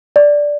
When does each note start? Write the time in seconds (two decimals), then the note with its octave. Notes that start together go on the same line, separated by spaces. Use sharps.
0.16 D5